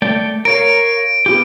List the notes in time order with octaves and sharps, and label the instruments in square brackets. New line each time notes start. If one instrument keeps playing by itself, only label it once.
[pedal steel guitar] A3 D5 G5
[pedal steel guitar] A#4 C#5 F5 [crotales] D7
[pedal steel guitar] B3 F4 G4